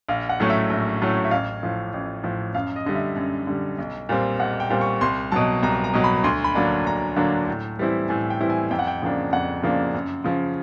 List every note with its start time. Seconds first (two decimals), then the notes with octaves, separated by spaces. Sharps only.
0.09 A#1 F5
0.29 F#5
0.40 A2 F#3 A3 C#4
0.50 E5
0.70 A#1
1.01 A2 F#3 A3 C#4
1.25 E5
1.31 A1 F5
1.63 A2 F3
1.94 A1
2.23 A2 F3
2.55 F#2 F5
2.76 D#5
2.86 D3 G3 D#5
2.95 E5
3.16 F#2
3.47 D3 G3
3.78 B1
4.09 A#2 G3 C4
4.40 B1 F#5
4.60 G5
4.70 A#2 G3 C4
4.81 C#6
5.01 C2 C6
5.32 B2 F#3 A5
5.63 C2 A#5
5.84 A#5
5.94 B2 F#3
6.04 B5
6.24 D2 C6
6.44 B5
6.55 D3 F#3 A#3 D4
6.86 D2 A#5
7.16 D3 F#3 A#3 D4
7.48 A2
7.79 E3 G3 C4 E4
8.09 A2 G#5
8.30 G5
8.40 E3 G3 C4 E4
8.50 G#5
8.70 F2 G5
8.79 F#5
8.87 G5
9.02 C#3 F3 A#3 D4
9.32 F2 F#5
9.63 C#3 F3 A#3 D4
9.94 F#2
10.24 C#3 F3